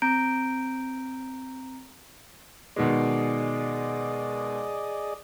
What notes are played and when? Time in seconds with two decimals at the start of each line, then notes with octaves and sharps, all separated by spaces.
0.02 C4 A#5 G6 D7
2.76 B2 D#3 G#3 G#4 D5 D#5